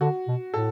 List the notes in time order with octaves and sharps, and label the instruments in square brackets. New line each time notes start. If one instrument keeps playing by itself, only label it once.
[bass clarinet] D3 [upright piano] F#4
[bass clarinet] B2
[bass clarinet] A2 [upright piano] A4